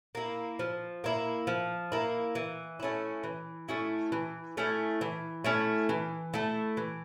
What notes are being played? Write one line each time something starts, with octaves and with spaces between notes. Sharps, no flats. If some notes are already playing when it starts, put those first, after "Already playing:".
A#3 E4
F3
A#3 E4
F3
A#3 E4
E3
A3 C#4 E4
E3
A3 C#4 E4
E3
A3 C#4 E4
E3
A3 C#4 E4
E3
A3 E4 A4
E3